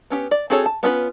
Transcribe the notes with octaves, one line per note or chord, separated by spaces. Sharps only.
B3 C#4 G4
D5
C4 F#4 G#4 A4 C#5
A5
B3 C#4 F4 B4